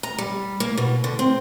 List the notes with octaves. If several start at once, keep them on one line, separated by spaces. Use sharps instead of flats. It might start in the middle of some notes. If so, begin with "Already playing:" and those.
A#5
G3
A#3
B2
D3
C4